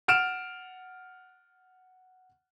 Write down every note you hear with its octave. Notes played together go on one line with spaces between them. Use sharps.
F#5 F6 D7 E7